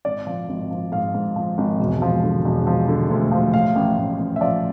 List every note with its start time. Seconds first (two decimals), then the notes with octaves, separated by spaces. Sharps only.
0.05 G#1 D5
0.27 F3
0.49 G#1
0.71 F3
0.92 G#2 F5
1.15 G#2
1.36 F3
1.58 G#1
1.79 E1
2.02 F3
2.23 D3
2.45 E1
2.67 F3
2.88 D3
3.10 D2
3.31 F3
3.54 A2 F5
3.75 A1
3.98 A1
4.19 A1
4.36 E5
4.41 F3 D5